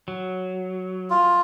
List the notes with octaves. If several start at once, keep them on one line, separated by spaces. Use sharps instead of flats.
F#3
F4